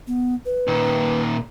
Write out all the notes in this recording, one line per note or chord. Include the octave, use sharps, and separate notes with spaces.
B3
B4
A#2 D#3